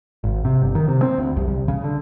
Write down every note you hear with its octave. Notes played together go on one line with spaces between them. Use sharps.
G#1
C3
G1
D#3
C3
C4
D2
C2
C2
C#3
D3